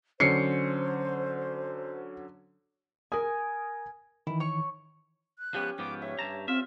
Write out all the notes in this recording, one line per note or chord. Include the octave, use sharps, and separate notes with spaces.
D3 F#3 C#4 C5 C7 C#7
A#4 G#5 D#6
D#3 E3 E4
C#5 C#6
F#6
F3 G#3 B3 C#4 G4
G#2 F3 B3 D6
C#5 E5
G2 A5 A#5
C4 F4 E5 F6